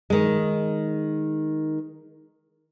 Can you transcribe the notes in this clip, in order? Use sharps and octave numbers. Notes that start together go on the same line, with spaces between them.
D#3 G#3